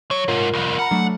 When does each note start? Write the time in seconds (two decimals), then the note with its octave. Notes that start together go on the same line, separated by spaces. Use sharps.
0.11 F#3 C#5
0.28 G#2 C3 F4 A#4
0.53 C2 F2
0.79 F#5 A#5 B5 F6
0.91 F#3 A3 D4